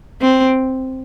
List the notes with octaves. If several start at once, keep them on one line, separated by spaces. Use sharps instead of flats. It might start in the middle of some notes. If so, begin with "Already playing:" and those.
C4